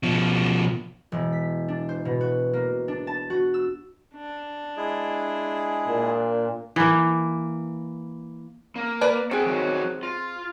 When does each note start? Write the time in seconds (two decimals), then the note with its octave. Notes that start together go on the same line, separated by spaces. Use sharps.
0.03 B2 F3
1.12 E1
1.32 B6
1.68 D4
1.89 C5
2.05 B2
2.21 F#4
2.53 A#3
2.88 D4
3.07 A5
3.30 F#4
3.54 E6
4.15 D4
4.77 G#3 E4 G#4
5.88 A#2
6.76 E3 A#3
8.76 A#3
9.01 A#4 B4 D5
9.31 C4 G#4 A4 F#5 G5
9.46 D#3 F#3 F#4
10.03 F4